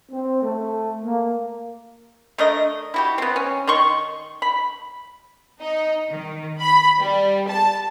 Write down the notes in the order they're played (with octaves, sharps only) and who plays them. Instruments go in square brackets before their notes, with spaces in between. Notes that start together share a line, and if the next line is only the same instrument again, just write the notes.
[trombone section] C4
A3
A#3
[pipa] A3 D4 A#4 D#5
E4 F#4 G4
B3 C4
C#4
D#3 C6 C#6
B5
[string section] D#4
D#3
B5
G3
A5